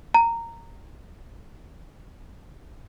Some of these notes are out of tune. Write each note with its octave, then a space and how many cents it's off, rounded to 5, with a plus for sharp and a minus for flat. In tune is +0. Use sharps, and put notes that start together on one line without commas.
A#5 -15